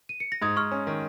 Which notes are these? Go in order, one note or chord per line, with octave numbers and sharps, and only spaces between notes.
D#7
C#7
A#6
G#2 D#6 G#6
G#2 C#6 F6
C#4
D#3